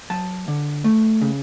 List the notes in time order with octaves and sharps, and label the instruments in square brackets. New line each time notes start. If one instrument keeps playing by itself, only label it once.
[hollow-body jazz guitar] F#3 A5
D3
A3
C#3